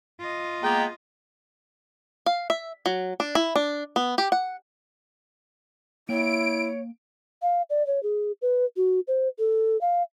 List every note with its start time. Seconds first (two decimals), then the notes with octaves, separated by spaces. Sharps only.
0.19 F4 D#5
0.63 G#3 A#3 B3 G5 A#5
2.26 F5
2.50 E5
2.86 F#3
3.20 D4
3.35 E4
3.56 D4
3.96 B3
4.18 G4
4.32 F#5
6.09 A#3 E4 C#5 G5 D7
7.42 F5
7.70 D5
7.87 C#5
8.03 G#4
8.42 B4
8.77 F#4
9.07 C5
9.39 A4
9.81 F5